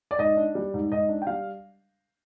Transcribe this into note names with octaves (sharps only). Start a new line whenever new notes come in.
D5
G#2 D#5
D4
G3
G#2
G#2 D#5
D4
G5
G3 F5